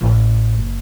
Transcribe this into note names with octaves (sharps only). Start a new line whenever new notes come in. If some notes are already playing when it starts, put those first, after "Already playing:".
A1
F#1